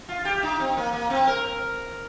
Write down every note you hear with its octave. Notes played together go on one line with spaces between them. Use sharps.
F4
G4
D#4
C4
A#3
A#3
C4
A#4